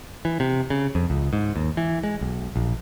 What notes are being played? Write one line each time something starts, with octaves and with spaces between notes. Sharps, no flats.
E3
C3
C#3
F2
C#2
G#2
D#2
E3
G#3
B1
A#1